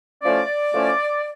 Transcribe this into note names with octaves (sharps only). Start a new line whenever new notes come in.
A2 F3 A3 C#4 D5
A2 F3 A3 C#4